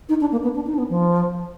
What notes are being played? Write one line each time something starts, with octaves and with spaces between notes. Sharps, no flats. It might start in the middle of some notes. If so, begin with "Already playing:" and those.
D#4
D4
A#3
B3
D4
D#4
D4
B3
F3